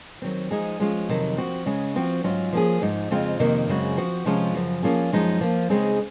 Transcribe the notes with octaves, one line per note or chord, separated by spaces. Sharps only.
D#3 F#3 C4
F3 G#3 D#4 G#4
F3 G#3 C#4 F4
F2 C3 D#3 F#3
F3 C4 F#4
C#3 G#3 C#4 G#4
F3 C4 F#4
G#2 F#3 C#4 F4
F3 A#3 C#4 G#4
G#2 F3 G#3 D#4
F2 C#3 G#3 C4 F4
F2 C3 D#3 A#3
F#2 C#3 G#3 C4 F#4
F3 C4 F#4
C3 F3 G#3 C#4 F4
F#2 C#3 F3
F3 A#3 C#4 F4 G#4
F#2 F3 G#3 D#4
F3 A#3 F4
C#3 G#3 C4 D#4 G#4